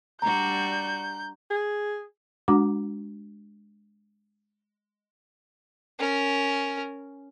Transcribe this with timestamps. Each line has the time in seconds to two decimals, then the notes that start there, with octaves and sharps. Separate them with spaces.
0.22 G3 D4 F#4 A#5 G6
1.50 G#4
2.48 G#3 D4 F#4 F#5 A#5 D6
5.99 C#4 A#4